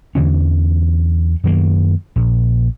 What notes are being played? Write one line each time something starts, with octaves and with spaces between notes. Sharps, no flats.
E2 D3 E3 C#4
F#2 D#3 F#3 A#3
A#1